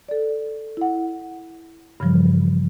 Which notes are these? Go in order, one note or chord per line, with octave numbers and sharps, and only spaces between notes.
A4 D5
E4 F#5
G2 C#3 E3 F3 G3